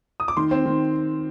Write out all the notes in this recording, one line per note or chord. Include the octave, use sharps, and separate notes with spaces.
D#6
D6
D#3 C6
C4
D#3